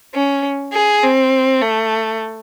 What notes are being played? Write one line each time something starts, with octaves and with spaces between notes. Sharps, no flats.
C#4
G#4
C4
A3